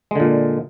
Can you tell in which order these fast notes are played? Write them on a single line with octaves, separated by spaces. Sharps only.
G#3 D3 A#2